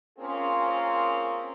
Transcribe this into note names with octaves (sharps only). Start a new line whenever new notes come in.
A#3 C4 C#4 F4 G#4 A#4